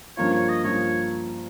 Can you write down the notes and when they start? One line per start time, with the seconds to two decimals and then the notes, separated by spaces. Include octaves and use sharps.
0.17 G2 F3 A#3 F4 C#5
0.33 C#5
0.49 D#5
0.64 G2 F3 A#3 F4 C#5